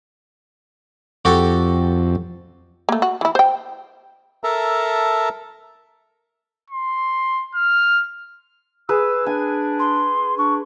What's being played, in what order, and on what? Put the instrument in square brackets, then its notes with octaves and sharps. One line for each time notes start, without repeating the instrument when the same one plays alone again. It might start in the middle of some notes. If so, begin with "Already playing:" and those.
[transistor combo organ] F2 [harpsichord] F#4 G4 A4
[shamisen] A3 A#3
F#4
E3 E4
C5 G5
[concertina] A4 A#4 E5 A5 A#5
[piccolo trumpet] C6
F6
[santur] G#4 B4 [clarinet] E6
[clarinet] D4 [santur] G#5
[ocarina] C6
[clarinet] D4 [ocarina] C#6